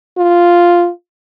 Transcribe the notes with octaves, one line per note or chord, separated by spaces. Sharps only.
F4